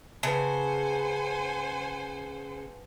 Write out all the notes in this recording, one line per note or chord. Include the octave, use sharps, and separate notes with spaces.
C#3 B4 C5 F#5 G#5 A5